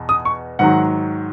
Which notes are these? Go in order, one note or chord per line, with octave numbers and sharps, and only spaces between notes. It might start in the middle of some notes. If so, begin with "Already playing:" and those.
Already playing: E2 B2
D#6
C#6
G#2 D#3 F#3 F#5